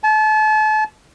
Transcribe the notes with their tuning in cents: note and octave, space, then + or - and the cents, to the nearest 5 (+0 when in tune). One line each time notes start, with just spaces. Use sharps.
A5 -35